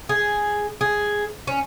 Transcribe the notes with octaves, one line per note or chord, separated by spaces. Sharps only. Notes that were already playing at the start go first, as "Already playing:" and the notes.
G#4
G#4
C#4